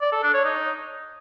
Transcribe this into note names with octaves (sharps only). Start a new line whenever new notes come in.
D5
A4
D4
C#5
D#4